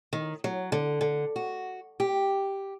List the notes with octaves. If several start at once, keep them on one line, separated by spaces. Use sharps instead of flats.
D#3
F#3
D3
D3
F#4
G4